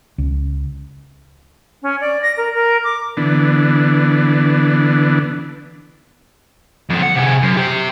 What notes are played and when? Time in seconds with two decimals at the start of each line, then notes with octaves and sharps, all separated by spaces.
0.18 C#2
1.82 C#4
2.00 D5
2.22 A#6
2.37 A#4
2.54 A#4
2.84 D6
3.17 D3 E3 B3 D4
6.90 F2 D3
7.03 F#5
7.16 C3 G#4
7.43 F#2
7.57 G4 C5